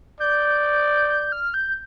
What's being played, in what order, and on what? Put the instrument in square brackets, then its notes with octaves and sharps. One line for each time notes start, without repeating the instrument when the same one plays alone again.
[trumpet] D5 [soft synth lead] G6
[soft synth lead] G6
F6
G6